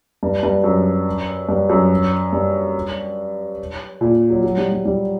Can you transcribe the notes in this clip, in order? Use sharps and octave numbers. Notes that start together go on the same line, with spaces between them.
G2
G2
F#2
G2
F#2
G2
A#2
F#3
F#3
G3
G3
G3